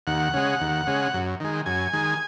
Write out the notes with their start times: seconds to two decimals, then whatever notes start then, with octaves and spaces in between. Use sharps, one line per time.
0.07 D#2 F#5
0.34 C#3 G#3
0.61 D#2
0.87 C#3 G#3
1.14 F#2
1.40 D#3 G#3
1.66 F#2 G#5
1.93 D#3 G#3